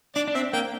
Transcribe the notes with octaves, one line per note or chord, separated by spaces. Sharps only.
D4 D5
D4
C4 E5
A#3 G5